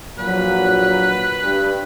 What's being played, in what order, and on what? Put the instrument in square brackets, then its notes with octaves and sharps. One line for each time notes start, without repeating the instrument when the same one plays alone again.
[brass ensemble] A#1 A#2 F#3 [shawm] B4
[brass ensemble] G2